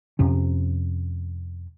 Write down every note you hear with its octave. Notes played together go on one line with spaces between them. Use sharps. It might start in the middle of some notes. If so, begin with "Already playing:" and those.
F2 C3 C#4